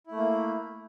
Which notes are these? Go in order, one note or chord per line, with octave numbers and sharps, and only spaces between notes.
A3 A#3 E4